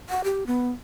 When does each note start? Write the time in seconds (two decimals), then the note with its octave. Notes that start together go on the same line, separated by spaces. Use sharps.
0.09 F#5
0.24 G4
0.47 B3